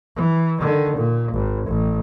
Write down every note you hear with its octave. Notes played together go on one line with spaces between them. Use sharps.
E3
D3 D#3
A#2
G#1
A1